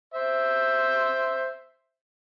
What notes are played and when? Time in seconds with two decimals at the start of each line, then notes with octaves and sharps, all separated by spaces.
0.14 C5 E5